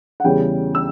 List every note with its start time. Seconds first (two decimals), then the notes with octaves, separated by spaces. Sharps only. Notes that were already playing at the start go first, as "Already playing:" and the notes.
0.20 F#5
0.24 E2 C#3 E3 G3 C#4 G5
0.75 E6